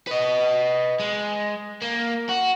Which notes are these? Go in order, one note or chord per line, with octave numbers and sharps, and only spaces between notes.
B4 D#5
G#3
A#3
F#4